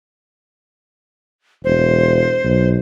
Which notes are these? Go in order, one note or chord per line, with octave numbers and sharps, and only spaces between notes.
E1 C5
B1